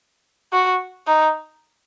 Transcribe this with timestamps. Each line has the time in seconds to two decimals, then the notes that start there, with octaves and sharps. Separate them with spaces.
0.53 F#4
1.07 D#4